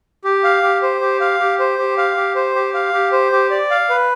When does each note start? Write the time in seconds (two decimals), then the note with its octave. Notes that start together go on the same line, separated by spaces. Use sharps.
0.25 G4
0.44 F5
0.63 G4
0.82 C5
1.01 G4
1.21 F5
1.40 G4
1.60 C5
1.78 G4
1.98 F5
2.17 G4
2.35 C5
2.55 G4
2.74 F5
2.93 G4
3.12 C5
3.32 G4
3.51 D5
3.71 F5
3.90 B4